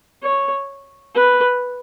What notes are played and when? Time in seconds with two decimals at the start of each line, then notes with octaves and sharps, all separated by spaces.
0.22 C#5
1.15 B4